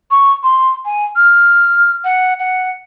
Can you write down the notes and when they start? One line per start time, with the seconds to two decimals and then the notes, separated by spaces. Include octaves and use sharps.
0.11 C#6
0.43 C6
0.85 G#5
1.16 F6
2.05 F#5
2.39 F#5